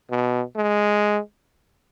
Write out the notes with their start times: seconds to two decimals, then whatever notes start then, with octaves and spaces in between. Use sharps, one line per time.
0.10 B2
0.56 G#3